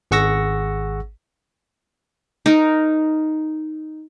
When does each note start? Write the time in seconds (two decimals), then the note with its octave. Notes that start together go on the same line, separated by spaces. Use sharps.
0.11 G#1 G#4 F#5 C#6 E6 A#6
2.46 D#4 A#4